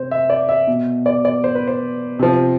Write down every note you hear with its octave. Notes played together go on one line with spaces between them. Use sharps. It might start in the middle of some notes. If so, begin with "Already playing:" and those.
Already playing: C3 C5
E5
D5
E5
B2
D5
D5
C5
B4
C5
C3 F3